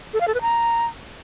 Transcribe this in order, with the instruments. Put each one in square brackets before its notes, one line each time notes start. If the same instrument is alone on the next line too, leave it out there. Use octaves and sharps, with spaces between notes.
[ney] A4
F5
A4
B4
A#5